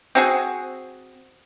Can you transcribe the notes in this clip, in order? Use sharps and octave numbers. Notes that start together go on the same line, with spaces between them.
C4 F#4 G#4